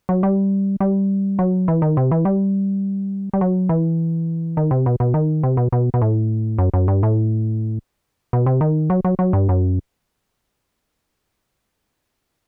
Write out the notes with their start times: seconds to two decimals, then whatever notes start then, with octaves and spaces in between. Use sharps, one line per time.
0.09 F#3
0.23 G3
0.80 G3
1.39 F#3
1.68 E3
1.82 D#3
1.97 C3
2.11 E3
2.25 G3
3.33 G3
3.41 F#3
3.69 E3
4.57 D#3
4.71 C3
4.86 B2
5.00 B2
5.14 D#3
5.43 C3
5.57 B2
5.72 B2
5.94 B2
6.02 A2
6.58 F#2
6.74 F#2
6.88 G2
7.03 A2
8.33 B2
8.46 C3
8.61 D#3
8.90 F#3
9.05 F#3
9.19 F#3
9.33 G2
9.49 F#2